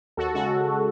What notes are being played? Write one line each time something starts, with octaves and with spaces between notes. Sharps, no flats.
D#2 F#4 A4
C#3 G#3 F#4 A4